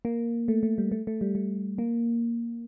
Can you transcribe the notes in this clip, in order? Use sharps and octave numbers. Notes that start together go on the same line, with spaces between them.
A#3
A3
A3
G3
A3
A3
G3
A3
A#3